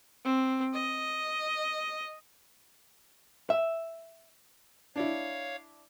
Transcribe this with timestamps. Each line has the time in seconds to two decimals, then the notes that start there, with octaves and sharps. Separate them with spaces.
0.25 C4
0.74 D#5
3.50 E5
4.96 D4 E4 C#5 F5